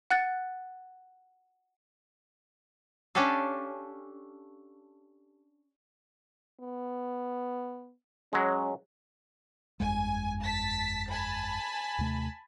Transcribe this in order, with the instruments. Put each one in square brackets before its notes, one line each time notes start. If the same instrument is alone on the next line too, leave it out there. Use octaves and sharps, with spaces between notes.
[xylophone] F#5 F#6 A6
[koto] C#4 D4 G4 A4 F5
[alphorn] B3
[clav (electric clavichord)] F#3 G#3 [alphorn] C#4
[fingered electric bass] G1 F2 G#3 [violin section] G#5
[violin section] A5 B6
G#5 A5 B5
[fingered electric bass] D#2 C3 A3